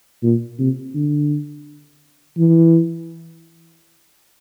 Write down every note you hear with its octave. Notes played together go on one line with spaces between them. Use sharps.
A#2
C3
D3
E3